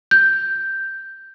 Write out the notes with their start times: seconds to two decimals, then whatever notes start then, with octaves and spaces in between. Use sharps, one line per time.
0.11 G6